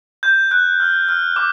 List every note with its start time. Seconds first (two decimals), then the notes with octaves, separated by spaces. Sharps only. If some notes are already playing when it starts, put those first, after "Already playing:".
0.23 G6
0.51 F#6
0.80 F6
1.09 F6
1.36 D6